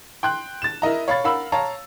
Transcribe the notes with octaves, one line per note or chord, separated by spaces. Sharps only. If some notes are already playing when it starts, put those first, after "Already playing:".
G5 C6 F#6
A6 E7
E4 A#4 D#5 A#5
C#5 F5 B5 C#6 A6
A#4 F5 F#5 B5 E6
C#5 F5 A5 A#5